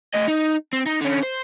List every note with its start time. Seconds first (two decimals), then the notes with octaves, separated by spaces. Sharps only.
0.14 A3 D#5
0.27 D#4
0.73 C4
0.86 D#4
1.01 D3 C#4
1.23 C5